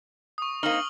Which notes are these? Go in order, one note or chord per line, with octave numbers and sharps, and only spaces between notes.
C#6 D#6
A#3 C4 D#4 F6 F#7 G7